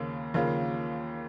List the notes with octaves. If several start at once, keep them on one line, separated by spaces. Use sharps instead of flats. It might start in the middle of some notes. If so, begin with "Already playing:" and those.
Already playing: D#2 C#3 F3 A#3 F4
D#2 C#3 F3 A#3 F4